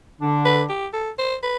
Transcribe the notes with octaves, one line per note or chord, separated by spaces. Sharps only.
D3 D4
B4
G4
A4
C5
B4